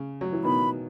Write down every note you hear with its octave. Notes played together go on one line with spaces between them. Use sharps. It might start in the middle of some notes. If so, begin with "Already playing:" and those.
Already playing: C#3
F#3
E3
B2 D#3 B5